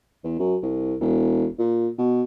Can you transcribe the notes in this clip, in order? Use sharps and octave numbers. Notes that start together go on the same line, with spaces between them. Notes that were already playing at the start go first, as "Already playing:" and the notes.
E2
F#2
C2
E1
A#2
B2